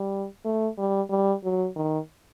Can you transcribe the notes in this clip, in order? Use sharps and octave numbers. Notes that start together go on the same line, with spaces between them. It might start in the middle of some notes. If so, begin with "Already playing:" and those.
Already playing: G3
A3
G3
G3
F#3
D#3